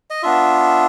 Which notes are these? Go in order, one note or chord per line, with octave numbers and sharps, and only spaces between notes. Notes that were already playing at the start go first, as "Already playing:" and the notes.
D#5
B3 D4 F4 E5